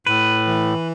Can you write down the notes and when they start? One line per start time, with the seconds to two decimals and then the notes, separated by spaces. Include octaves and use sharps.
0.06 A2 B4
0.47 E3